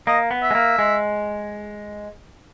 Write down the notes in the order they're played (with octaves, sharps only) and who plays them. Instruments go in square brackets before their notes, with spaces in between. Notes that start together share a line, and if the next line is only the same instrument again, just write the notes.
[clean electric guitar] A#3 [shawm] D#5
[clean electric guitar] B3
[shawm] E5
[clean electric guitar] G#3
A#3
G#3